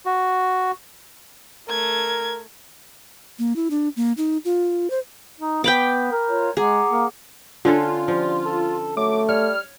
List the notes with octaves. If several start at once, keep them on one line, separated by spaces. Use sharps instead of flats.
F#4
A3 A#4 G#6
A#3
E4
D4
A#3
D#4
F4
C5
D#4
B3 G5 B5 D6
A#4
F4 C#5
G#3 G#4 F#5 A#5 D6
A#3
D3 C#4 F4 A4
F3 G3
A4
F#3 A3 D6
G3 C#5 F6